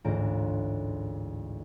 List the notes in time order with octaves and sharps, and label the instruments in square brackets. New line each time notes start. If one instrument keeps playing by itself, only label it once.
[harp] A1 D2 G#2 F4 A#5 D7